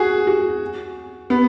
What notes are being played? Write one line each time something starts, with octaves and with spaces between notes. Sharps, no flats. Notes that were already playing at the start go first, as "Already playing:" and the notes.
Already playing: F#4 G#4
F#4
B3